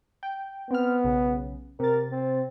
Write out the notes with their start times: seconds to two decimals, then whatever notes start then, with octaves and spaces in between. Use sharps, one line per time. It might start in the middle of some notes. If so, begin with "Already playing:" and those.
0.23 G5
0.71 B3 C4 F6
1.04 B1 C#3
1.79 C3 A#4 A6
2.11 C4